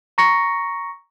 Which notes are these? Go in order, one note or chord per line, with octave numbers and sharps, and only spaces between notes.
A#5 C#6 A#6 C#7